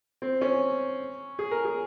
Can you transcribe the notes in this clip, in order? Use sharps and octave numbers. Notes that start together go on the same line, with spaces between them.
C4
C#4
G#4
A#4
G#4